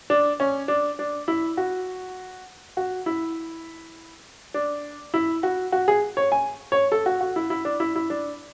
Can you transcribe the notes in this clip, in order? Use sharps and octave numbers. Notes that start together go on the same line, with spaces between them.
D4
C#4
D4
D4
E4
F#4
F#4
E4
D4
E4
F#4
F#4
G#4
C#5
G#5
C#5
A4
F#4
F#4
E4
E4
D4
E4
E4
D4